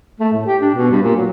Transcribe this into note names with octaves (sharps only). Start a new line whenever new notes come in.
A3
A2
G4
D4
B2
G2
A#2
F#3